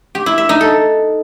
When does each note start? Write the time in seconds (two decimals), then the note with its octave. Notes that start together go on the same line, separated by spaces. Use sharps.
0.15 G4
0.26 E4
0.38 E5
0.49 D#4
0.61 A4